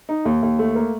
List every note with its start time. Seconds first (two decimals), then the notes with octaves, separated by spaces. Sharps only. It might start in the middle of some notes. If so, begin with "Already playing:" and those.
0.09 D#4
0.25 D#2
0.43 D#2
0.59 A3
0.75 A#3